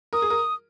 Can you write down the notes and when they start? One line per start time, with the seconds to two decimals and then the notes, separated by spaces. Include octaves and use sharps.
0.13 A#4 D#6
0.22 G#4
0.30 A#4